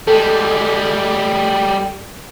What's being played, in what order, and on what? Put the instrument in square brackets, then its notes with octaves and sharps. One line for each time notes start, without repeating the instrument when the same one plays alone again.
[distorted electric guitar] G3 G#3 [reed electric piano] A4